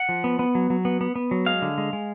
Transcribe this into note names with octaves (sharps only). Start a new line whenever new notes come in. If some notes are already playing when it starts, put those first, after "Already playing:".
Already playing: F#5
F3
B3
B3
F#3
F#3
B3
B3
B3
F#3
G#3 F5
D3
G#3
G#3